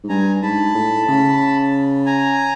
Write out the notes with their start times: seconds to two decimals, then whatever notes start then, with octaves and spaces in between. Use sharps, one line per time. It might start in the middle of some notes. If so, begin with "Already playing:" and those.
0.04 G#2
0.09 G2 G#5 A#5
0.42 G#2 A5 B5
0.74 A2
1.08 C#3
2.06 G#5 A#5